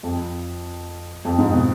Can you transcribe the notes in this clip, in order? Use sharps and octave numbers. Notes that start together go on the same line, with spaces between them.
F2
F2
G#2
B2